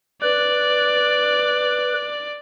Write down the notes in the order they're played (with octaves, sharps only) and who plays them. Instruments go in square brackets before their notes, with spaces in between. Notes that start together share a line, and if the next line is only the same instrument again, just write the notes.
[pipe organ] B4 [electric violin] D5